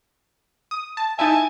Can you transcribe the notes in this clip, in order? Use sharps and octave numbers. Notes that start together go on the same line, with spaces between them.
D#6
A5
D#4 E4 E5 G#5 A5